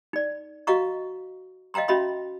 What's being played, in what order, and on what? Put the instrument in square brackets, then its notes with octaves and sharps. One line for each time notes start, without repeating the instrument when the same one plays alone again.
[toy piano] D#4 D5
F#4 D#5 F5 F#5 A#5 C#6
D#5 F5 G5 A#5 C6
C#4 F#4 D#5 E5 B5 C6